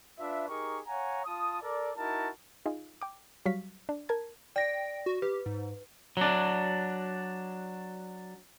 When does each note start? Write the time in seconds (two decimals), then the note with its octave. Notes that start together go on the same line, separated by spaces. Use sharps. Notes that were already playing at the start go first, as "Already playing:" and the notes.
0.19 D4 F4 B4 E5
0.49 D#4 G4 G#4 A#4 C#6
0.87 C#5 F5 F#5 G#5 A#5
1.25 F4 A5 D#6
1.61 A4 A#4 D5
1.97 D#4 E4 F#4 A#4 A5
2.66 D#4 F4 G#4
3.02 G5 D6
3.46 F#3 G3 F5 C#6 B6
3.89 D4
4.09 A#4 A5 G#6
4.56 D5 G5 A#6
5.06 F#4
5.22 G4 B4
5.46 G#2
6.17 F#3 D4